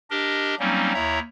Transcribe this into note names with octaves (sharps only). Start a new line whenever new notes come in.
D4 G4 A#4 D#5
F#3 G3 A#3 C4 C#4 D#4
D#2 E4 C#5 E5 A#5